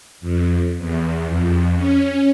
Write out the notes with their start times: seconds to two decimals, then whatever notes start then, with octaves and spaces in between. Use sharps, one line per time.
0.21 F2
0.77 E2
1.26 F2
1.76 C#4